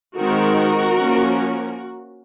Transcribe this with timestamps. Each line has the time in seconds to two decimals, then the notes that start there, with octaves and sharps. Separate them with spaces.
0.17 D#3 G#3 C4 D#4 F#4 A#4
0.96 F3 A#3 C#4